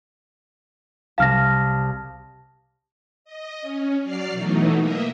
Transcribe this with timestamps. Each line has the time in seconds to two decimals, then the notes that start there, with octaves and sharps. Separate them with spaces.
1.18 C2 F5 A5 F6 A#6
3.25 D#5
3.61 C#4
4.01 F#3 D5 F6 C7
4.31 B2 E3 F#3 A3 D#4
4.74 A#3 D#5 E5